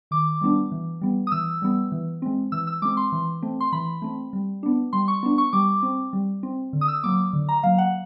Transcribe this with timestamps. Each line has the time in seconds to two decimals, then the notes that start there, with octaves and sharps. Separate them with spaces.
0.11 D#3 D6
0.41 G3 B3 D4
0.72 E3
1.01 G3 B3
1.27 D#6
1.32 E3 E6
1.62 G3 B3
1.92 E3
2.22 G#3 C4
2.52 E3 E6
2.67 E6
2.82 G#3 C4 D6
2.97 C6
3.12 E3
3.42 A3 C4
3.61 C6
3.72 E3 B5
4.02 A3 C4
4.33 G3
4.63 B3 D4
4.93 G3 C6
5.08 C#6
5.23 B3 D4
5.38 C#6
5.53 G3 D6
5.83 C4
6.13 G3
6.43 C4
6.73 D3
6.81 D#6
6.88 E6
7.04 F#3 A#3 D6
7.33 D3
7.49 A#5
7.63 F#3 A#3 F5
7.78 F#5